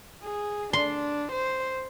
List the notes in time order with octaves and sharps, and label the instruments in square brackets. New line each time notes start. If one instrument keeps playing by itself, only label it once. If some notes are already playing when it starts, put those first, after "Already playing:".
[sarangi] G#4
[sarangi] D4 [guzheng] C6
[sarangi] C5